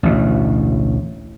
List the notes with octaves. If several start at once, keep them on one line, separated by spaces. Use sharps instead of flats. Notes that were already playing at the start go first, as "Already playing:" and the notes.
A1 D2 B2